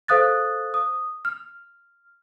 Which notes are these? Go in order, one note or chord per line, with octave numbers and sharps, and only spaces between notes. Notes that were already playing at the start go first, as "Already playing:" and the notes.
A4 C5 F5 D#6 F#6 A6
D#6
F6